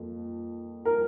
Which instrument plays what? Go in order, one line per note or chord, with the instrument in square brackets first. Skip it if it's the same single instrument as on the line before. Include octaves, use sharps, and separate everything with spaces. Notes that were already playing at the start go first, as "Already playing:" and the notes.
Already playing: [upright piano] F2 F3 A#3
A#4